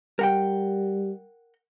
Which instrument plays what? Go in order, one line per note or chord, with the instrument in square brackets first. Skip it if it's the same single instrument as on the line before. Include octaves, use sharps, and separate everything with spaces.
[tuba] G3 [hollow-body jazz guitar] A#4 F#5 G5